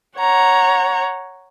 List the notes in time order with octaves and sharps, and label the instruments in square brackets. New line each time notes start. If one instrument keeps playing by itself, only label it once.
[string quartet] C#5 F#5 A#5